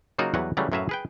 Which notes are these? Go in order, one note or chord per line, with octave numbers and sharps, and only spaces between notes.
C#3 F#3 A#3 D#4 F4 F#4
E2 F#3 G3 B4 F#5
C#3 E3 F#3 G3 A3
F#2 A2 F#3 B4 E5 F5
G#4 B4 G5